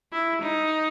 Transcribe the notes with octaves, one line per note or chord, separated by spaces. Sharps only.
E4
D#4